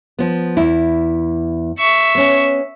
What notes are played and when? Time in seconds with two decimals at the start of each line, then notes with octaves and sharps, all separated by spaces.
0.19 F3 B3
0.57 E2 E4
1.79 E5 C#6
2.15 B3 C#4